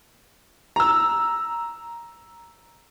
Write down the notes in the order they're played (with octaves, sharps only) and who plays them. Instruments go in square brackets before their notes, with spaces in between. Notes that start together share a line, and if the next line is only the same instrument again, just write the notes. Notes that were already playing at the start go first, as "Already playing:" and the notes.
[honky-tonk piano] A#5 E6